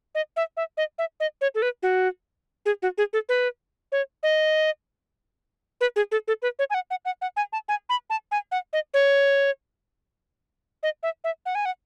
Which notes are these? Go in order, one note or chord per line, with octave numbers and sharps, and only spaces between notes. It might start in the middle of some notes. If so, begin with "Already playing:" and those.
D#5
E5
E5
D#5
E5
D#5
C#5
A4
B4
F#4
G#4
F#4
G#4
A4
B4
C#5
D#5
B4
G#4
A4
A4
B4
C#5
G#5
F#5
F#5
F#5
F#5
G#5
A5
G#5
B5
A5
G#5
F#5
D#5
C#5
D#5
E5
E5
F#5
G#5
F#5